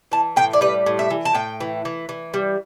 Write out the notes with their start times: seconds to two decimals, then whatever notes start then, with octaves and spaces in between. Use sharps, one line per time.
0.12 E3 A5
0.36 A2 G5
0.53 D5
0.61 G3 B4
0.86 A2
0.99 E5
1.11 E3
1.25 A5
1.34 A2 G5
1.60 E3
1.85 E3
2.09 E3
2.34 G3